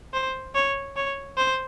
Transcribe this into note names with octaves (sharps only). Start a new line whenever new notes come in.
C5
C#5
C#5
C5